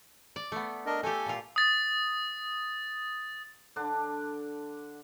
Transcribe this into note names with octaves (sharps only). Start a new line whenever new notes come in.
D5
A3 B3
D4 A#4 D#5
A3 G4 A4 G#5
A#2 F4
D#6 A6
D3 D4